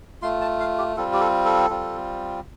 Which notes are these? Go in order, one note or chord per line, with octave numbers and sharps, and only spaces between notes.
A3 F4 C6
A5
F5
G4
G3 C4 F4 A4
G4
A4
A4
G3 C4 F4